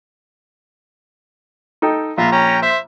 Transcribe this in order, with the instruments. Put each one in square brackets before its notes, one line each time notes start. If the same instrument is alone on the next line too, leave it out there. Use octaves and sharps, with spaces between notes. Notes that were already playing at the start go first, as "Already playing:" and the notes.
[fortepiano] D#4 A4 G5
[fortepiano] A#1 [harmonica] F4 E5 A#5
[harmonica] C#4 G5 A#5
C5 E5